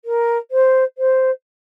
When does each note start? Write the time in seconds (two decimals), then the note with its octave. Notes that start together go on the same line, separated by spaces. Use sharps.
0.05 A#4
0.51 C5
0.97 C5